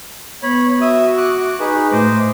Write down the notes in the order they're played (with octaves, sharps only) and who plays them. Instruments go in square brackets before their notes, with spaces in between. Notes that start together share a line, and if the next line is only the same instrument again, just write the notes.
[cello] B3 [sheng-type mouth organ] C#5 B5
[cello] F#4 [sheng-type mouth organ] E5 D#6
[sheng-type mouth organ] D6 F#6
D#4 G#4 B4
[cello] A2 [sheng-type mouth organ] C5 D#5 D6